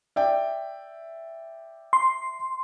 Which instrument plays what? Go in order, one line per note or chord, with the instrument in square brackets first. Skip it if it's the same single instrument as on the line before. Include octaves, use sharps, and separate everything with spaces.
[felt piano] D5 E5 G5
[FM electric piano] C6